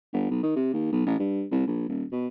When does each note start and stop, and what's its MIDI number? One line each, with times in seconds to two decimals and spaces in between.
0.13 0.26 31
0.30 0.42 35
0.43 0.51 51
0.56 0.72 48
0.73 0.89 39
0.92 1.03 35
1.06 1.17 33
1.20 1.45 43
1.51 1.64 36
1.67 1.89 34
1.89 2.04 27
2.12 2.28 47